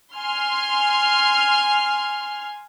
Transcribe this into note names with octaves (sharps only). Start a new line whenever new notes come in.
G#5 C6 F6